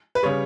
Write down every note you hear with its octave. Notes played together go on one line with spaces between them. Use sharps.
B4
C#3 G3 C#5